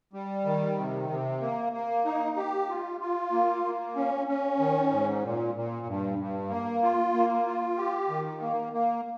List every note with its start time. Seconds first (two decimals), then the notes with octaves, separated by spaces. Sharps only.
0.13 G3
0.45 D#3
0.77 C3
1.10 C3
1.41 A#3
1.73 A#3
2.05 D#4
2.37 G4
2.69 F4
3.01 F4
3.32 A#3
3.64 A#3
3.96 C#4
4.27 C#4
4.59 D#3
4.91 G#2
5.23 A#2
5.55 A#2
5.87 G2
6.18 G2
6.50 A#3
6.82 F4
7.14 A#3
7.46 F4
7.77 G4
8.09 D#3
8.41 A#3
8.73 A#3